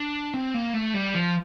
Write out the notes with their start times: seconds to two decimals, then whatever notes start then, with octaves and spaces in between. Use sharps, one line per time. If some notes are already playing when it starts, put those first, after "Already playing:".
Already playing: D4
0.34 C4
0.54 A#3
0.74 A3
0.94 G3
1.14 F3